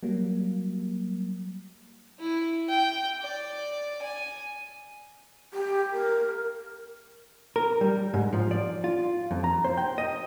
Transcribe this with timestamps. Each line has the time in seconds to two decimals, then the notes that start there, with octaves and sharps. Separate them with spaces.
0.03 F#3 G3 A#3
2.19 E4
2.69 G5
3.21 D5
4.02 G#5
5.54 G4
5.92 A#4
7.56 A#4
7.81 G3
8.14 G#2
8.33 F3
8.51 D5
8.84 F4
9.31 F2
9.44 A#5
9.64 C5
9.78 G5
9.98 D#5